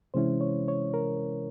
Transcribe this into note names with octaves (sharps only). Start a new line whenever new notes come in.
C3 E3 G#3 C#4 E4 C5
C#5
C#5
A#4